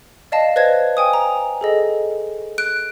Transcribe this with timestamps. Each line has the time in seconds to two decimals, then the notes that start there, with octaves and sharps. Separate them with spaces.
0.32 D5 D#5 F5 A5
0.56 B4 C5 D5 D#5 G#6
0.97 G5 G#5 D#6
1.13 A#5
1.61 G#4 A4 D#5
2.58 F#6 D7